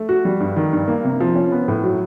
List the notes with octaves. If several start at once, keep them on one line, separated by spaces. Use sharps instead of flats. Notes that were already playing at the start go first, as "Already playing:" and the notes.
Already playing: A3
F#4
G3
G2
D#3
G2
A#3
C3
F3
C#4
B3
A2
F#3